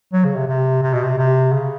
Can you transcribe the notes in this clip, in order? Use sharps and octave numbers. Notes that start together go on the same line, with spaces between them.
F#3
C#3
C3
C3
C3
B2
C3
C3
C#3